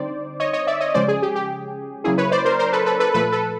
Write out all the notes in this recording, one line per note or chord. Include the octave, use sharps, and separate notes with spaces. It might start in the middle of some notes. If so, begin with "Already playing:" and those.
Already playing: D3 G3 C4 D#4 C5 D5
C#5 D#5
C#5 D#5
D5 E5
C#5 D#5
C#3 F3 G#3 C#4 C5 D5
G#4
G4
G4
C#3 F#3 A#3 C#4 E4 G#4
B4 C#5
C5 D5
A#4 C5
A#4 C5
A4 B4
A4 B4
A4 B4
A#2 F3 A3 A4 B4
A4 B4